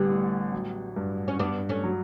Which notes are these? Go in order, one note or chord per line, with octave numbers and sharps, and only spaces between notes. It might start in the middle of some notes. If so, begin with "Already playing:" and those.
Already playing: A1 D3 G3 B3
A2
F#3
G2
C#4
G2 B3 D4
A3 C#4
F#3